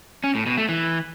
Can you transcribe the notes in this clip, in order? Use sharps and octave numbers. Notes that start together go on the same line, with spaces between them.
C#4
A2
B2
A3
E3